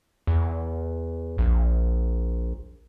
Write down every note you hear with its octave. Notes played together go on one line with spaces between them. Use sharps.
E2
A#1